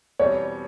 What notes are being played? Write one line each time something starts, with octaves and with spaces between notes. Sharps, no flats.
E2 B2 G3 C4 C#5